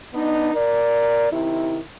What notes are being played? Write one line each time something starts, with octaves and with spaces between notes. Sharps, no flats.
B3 D4 D#4
A#4 D5
C3 D#3 E4